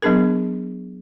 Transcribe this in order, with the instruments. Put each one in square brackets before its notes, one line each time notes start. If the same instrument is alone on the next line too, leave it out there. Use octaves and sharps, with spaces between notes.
[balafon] F#3 B3 D4 G#4 A#4